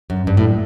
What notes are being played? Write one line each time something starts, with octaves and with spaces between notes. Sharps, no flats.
F#2
G2
A2